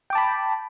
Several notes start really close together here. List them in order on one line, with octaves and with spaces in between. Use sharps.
G5 D6 A5 B5